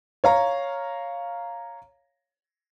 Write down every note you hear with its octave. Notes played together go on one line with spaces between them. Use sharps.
C#5 F5 A#5